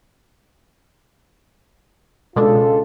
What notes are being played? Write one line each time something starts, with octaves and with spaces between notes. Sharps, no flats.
C#2 B2 G#3 D4 F4 A4